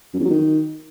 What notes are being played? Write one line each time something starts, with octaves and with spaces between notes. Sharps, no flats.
F#2
E2
F#3
D#3